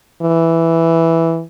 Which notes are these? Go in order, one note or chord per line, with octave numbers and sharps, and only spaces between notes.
E3